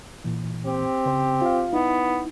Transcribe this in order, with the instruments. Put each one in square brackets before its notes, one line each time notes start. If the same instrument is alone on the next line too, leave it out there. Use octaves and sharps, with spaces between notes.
[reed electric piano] A#2 E3
[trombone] C4 [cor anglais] G4
[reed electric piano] C#3 C5
F4 F5
[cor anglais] B3 [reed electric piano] D#4 E4